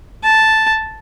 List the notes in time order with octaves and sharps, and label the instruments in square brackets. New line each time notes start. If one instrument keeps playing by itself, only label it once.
[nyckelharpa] A5